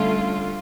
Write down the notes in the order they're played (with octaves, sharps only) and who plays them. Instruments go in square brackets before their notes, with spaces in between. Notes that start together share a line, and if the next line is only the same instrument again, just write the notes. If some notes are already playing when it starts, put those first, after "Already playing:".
Already playing: [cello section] D3 G3 C#4 F4 [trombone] A3